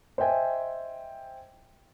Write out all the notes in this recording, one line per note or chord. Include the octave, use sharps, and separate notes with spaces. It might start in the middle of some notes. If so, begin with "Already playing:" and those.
C5 D#5 E5 G5 G#5